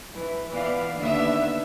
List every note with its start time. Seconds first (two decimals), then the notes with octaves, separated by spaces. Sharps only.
0.15 E3
0.52 A#2 E3 B3 D5 F5
0.97 D#2 D3 A#3 B3 E5